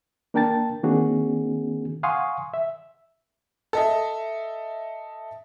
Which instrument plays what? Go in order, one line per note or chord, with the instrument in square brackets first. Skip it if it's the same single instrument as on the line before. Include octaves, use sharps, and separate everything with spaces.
[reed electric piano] A#3 D4 A#4 G5 A5 A6
D#3 A#3 C4 D4 F#4 G#4
F5 F#5 G#5 C6 C#6 D#6
E5
[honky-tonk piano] A4 D#5 E5